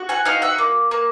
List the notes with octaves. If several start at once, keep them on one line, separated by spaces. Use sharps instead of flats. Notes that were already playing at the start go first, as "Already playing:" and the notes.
Already playing: F#4
F#5 G#5
D#4 F5 G5
E5 F#5
A#3
A#3